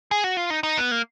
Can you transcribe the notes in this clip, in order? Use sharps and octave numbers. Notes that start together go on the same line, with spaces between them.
G#4
F#4
F4
D#4
D#4
B3
A#3